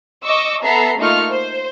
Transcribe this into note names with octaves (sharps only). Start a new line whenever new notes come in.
D#5 C#6 D6 E6
B3 A4 E5 A#5 C7
A3 A#3 D#4 F4 C#6 F6
C5